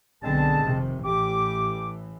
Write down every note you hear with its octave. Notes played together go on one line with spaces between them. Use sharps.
B1 D3 G#3 B3 C4 A5
F1 C3 D#3
A1 A2 E3 G4 D6